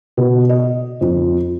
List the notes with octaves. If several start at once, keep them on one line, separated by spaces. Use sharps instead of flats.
B2
D#5
F2